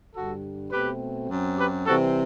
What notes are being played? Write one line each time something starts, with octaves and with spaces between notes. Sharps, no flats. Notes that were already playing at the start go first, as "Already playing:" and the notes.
G2 D3 G3 F#4 A4
B2 A3 C4 G4 B4
F#2 F#3 C4
G4 B4
C3 E3 G3 C4 F#4 A4